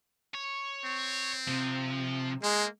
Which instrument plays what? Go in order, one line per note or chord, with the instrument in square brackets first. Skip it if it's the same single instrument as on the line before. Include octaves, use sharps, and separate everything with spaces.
[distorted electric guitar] C#5
[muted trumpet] C4
[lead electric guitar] C3 [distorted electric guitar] F3
[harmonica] G#3 [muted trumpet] A#3